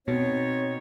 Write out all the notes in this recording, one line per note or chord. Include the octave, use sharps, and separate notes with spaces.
B2 C4 D#4 C#5